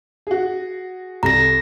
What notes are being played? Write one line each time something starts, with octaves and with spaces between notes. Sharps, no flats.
F#4 G#4
C2 A4 A#5 A#6